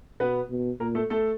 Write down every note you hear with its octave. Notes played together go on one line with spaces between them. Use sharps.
B2 B3 B4
B2
A#2 A#3 A#4
A3 A4
A3 A4